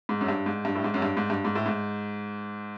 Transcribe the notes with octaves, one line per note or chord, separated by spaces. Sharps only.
G#2
F#2
G2
G#2
G2
A2
G#2
F#2
G2
G#2
G2
G#2
A2
G#2